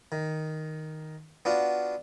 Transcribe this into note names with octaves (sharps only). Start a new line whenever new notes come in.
D#3
B3 D4 F4 F#4